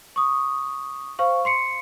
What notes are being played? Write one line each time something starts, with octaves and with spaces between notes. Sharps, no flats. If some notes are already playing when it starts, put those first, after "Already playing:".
C#6 D#6
C5 F5 C#6
C6 C7 C#7